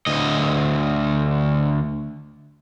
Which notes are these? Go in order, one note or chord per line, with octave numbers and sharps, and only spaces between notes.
D2 D#5